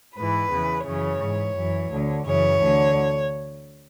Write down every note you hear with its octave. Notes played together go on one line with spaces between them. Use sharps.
G#2 E3 B4
E2 C#3 E3
F#2 C#3 E3 C#5
G#2 E3
F#2 E3
D2 D3
F#2 C#3 E3 C#5
D2 D3